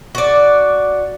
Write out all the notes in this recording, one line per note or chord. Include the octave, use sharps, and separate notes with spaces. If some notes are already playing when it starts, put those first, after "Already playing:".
F#4 D5